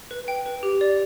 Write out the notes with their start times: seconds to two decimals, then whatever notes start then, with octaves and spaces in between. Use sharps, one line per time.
0.11 B4
0.28 G5
0.46 B4
0.63 G4
0.81 D5